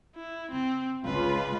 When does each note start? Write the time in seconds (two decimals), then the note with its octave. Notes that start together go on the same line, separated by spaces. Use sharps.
0.16 E4
0.52 C#3 C4
1.06 G#1 C#2 D3 F4 B4